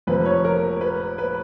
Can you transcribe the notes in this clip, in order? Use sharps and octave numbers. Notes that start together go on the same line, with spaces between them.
F1 F2 F3 B4
C#5
A#4
B4
B4